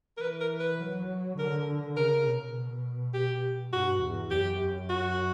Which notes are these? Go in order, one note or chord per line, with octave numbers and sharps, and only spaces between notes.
A#4
E3 B4
A#4
B4
F#3
D3 A#4
C#3 A#4
B2
G4
G2 F#4
E2
F#2 G4
F#4